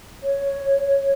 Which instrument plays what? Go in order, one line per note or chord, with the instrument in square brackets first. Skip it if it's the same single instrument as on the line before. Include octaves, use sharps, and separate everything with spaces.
[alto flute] C#5